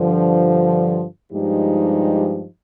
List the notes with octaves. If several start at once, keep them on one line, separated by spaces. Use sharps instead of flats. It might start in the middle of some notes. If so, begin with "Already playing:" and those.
Already playing: G2 D3 F3
G2 F3 G#3 D#4 G4